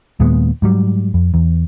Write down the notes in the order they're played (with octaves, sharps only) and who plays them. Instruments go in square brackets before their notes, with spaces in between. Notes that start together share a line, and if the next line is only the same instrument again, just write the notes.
[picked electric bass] D#2 A#2 G#3 B3
G#2 F#3 G3
F2
E2